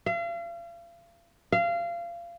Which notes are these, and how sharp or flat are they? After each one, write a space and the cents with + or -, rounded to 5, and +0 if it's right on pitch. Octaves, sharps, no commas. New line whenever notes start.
F5 -40
F5 -25